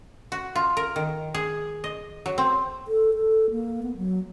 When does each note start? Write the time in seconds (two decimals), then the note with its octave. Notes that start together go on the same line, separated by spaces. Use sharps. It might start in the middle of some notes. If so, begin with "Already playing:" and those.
0.32 F#4
0.56 F4
0.77 A#4
0.96 D#3
1.34 G#4
1.84 D#5
2.26 F#3
2.38 C4
2.87 A4
3.14 A4
3.51 A#3
3.83 B3
3.97 F#3